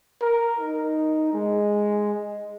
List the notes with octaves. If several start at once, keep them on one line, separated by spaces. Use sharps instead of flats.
A#4
D#4
G#3